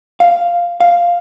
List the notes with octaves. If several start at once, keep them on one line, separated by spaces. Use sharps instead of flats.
F5
F5